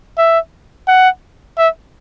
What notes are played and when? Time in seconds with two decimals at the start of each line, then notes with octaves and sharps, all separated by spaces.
0.18 E5
0.88 F#5
1.58 E5